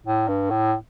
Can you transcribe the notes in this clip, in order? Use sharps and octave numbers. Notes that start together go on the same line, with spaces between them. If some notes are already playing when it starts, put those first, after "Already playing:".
A2
G2
A2